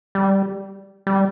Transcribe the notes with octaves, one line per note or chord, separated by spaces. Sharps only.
G3
G3